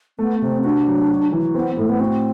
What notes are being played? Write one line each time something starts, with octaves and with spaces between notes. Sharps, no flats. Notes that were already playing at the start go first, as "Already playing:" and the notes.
A3 B3
C3 C4
D4 F#4
F#3
F#4
E3
B3 C4
A2 A3
B3
C4 F#4